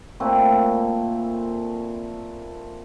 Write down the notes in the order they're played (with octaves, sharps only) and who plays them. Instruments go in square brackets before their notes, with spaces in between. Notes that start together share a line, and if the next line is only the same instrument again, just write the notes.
[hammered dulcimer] A#2 A3 C4 E4